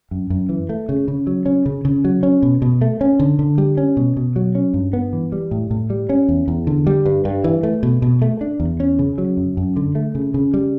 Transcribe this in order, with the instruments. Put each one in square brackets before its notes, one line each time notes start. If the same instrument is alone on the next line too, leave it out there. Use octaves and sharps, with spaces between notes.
[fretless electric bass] F#2
F#2
E3
A3
C#3
C#3
F#3
C#4
C#3
C#3
F#3
C#4
B2
B2
A3
C#4
D3
D3
G3
C#4
B2
B2
F#3
C#4
G2
B3
E3
G3
A2
A2
G3
C#4
E2
E2
D3
G3
G2
G2
E3
A3
B2
B2
A3
D4
E2
C#4
C#3
F#3
F#2
F#2
D3
A3
C#3
C#3
G3